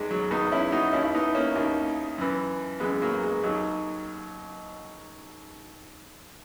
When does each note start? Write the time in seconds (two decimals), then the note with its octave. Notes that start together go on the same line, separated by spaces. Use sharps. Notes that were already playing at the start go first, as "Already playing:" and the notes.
Already playing: E2 D#3 G#3
0.11 F#3
0.31 E2 D#3 B3 D#4
0.52 C#4 E4
0.72 D#4 F#4
0.93 D#2 D#3 C#4 E4
1.05 E4
1.14 B3 D#4
1.35 A#3 C#4
1.55 D#2 D#3 A#3 C#4
2.18 F#2 E3
2.80 F#2 E3 G#3 B3
3.02 F#3 A#3
3.23 G#3
3.44 D#2 D#3 F#3